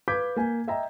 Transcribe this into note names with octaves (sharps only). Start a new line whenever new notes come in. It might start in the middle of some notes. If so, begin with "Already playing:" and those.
B4 F5 D6 G6 G#6 B6
A#3 G#5
D#5 E5 G5 A#5